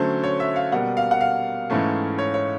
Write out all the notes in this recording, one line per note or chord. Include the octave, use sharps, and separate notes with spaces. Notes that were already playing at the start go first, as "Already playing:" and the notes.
Already playing: D3 F#3 A3 C#4 C5
C#5
E5
F5
B2 G3 A#3 F#5
F5
F#5
F5
G#2 E3 A3 C#4
C#5
C#5